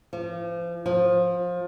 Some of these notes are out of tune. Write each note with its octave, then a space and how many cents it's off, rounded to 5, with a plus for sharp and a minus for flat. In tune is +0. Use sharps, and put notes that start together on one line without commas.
F3 -35
F3 +20